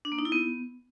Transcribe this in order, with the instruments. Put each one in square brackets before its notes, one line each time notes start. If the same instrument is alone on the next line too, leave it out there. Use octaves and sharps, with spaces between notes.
[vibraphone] D4
A#3
D#4
E4
B3